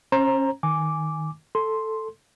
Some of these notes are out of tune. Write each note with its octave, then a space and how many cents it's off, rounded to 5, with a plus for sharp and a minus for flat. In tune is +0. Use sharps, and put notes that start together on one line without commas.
C#4 -25 C5 +30 A#5 +0
D#3 +0 G#5 +0 D6 -5
A4 +0 C6 +0